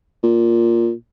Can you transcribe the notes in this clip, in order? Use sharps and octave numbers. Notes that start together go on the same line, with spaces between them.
A#2